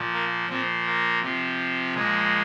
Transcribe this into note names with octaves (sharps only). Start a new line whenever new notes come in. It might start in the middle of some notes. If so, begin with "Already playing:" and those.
Already playing: A#2 F3
A#3
A#2 F3 C4
A#3
C3 F3
A#2 F3 G#3